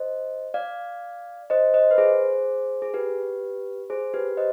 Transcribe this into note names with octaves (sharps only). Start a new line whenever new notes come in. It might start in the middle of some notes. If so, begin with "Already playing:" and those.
Already playing: C5 D#5
D5 F5
C5 D#5
C5 D#5
B4
G#4 C5
G#4
G4 B4
G#4 C5
G4 B4
C5 D#5